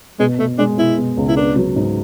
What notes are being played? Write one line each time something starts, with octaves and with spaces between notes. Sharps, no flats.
B2 G#3
B2 A3
G#3 D4
B2 E4
B2
C#2
E4
B3 D4
F#3
G#2